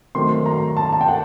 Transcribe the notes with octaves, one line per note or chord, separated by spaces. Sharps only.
D#3 F#3 A3 C4 C6
A#5
A5
A5
G5
F#5